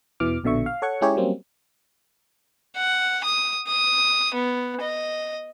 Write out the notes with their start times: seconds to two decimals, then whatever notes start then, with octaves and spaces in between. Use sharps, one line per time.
0.20 E2 B2 E3 D6 F6
0.44 A#1 B2 D3 E5 C#6
0.66 F5
0.82 A4 C#5 F#5 C#6
1.01 G#3 C#4 E4 G4 G#4 C#5
1.17 F#3 G3 A#3 C4 C#4
2.76 F#5
3.25 D#6
3.67 D#6
4.34 B3
4.81 D#5